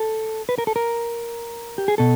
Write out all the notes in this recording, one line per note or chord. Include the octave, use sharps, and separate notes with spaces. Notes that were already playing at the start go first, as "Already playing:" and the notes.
Already playing: A4
B4
A#4
A4
A#4
G4
G#4
B2 A4